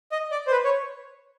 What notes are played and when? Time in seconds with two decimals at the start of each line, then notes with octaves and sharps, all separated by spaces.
0.12 D#5
0.31 D5
0.47 C5
0.51 B4
0.65 C#5